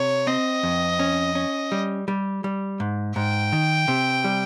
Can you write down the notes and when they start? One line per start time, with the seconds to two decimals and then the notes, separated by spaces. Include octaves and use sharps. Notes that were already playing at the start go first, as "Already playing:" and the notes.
Already playing: C3 C#5
0.27 C4 D#5
0.63 F2
0.99 C#4
1.35 C#4
1.72 G3
2.08 G3
2.44 G3
2.80 G#2
3.16 G#2 G5
3.52 D#3
3.88 C3
4.24 G3